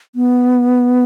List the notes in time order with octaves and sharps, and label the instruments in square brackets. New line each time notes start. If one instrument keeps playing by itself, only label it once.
[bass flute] B3